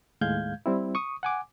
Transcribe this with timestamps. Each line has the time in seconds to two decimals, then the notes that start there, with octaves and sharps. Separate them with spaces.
0.21 D#2 A2 G#3 F5 G6 G#6
0.66 G3 C4 E4
0.95 C#6 D#6
1.23 F#5 G#5 D6